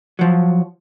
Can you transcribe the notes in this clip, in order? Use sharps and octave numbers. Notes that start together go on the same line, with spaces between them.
F3 F#3